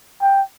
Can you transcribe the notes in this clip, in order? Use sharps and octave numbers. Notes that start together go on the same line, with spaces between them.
G5